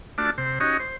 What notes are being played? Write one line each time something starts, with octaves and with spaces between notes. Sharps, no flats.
A3 D4 F4 F#4 D5 A5
C3 C5
C#4 D#4 F#4 G4 C#5 D#5
C5